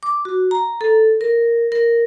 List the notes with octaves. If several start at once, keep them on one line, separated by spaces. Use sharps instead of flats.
D6
F#4
A#5
A4
A#4
A#4